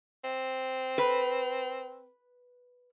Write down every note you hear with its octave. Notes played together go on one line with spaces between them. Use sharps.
C4
B4